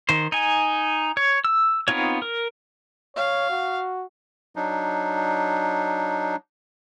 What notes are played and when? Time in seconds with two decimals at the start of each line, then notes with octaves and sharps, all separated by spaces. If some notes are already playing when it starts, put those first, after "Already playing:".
0.09 D#3 C5
0.32 D#4 G#5
1.17 C#5
1.45 E6
1.88 B3 C4 D#4 F4 C#5
2.22 A#4
3.16 C#5 F5
3.50 F#4
4.56 F#3 D4 D#4